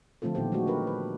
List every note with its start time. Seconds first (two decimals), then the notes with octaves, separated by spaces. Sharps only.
0.22 D3 F3 A3 C4 F4 A4
0.35 A#2 D#3 B3 G4 C5
0.52 F#3 G#3 A3 D4 F#4
0.67 D4 G4 A#4 B4
0.87 B4